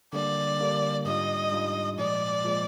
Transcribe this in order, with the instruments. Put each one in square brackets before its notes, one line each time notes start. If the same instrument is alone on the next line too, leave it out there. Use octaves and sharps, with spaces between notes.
[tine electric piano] D3 G3 A#3 D4 [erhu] D5
[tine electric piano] D3 G3 A#3 D4
[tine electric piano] G#2 G3 D4 F4 [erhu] D#5
[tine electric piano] G#2 G3 D4 F4
[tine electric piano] A#2 F3 G#3 [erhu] D5
[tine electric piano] A#2 F3 G#3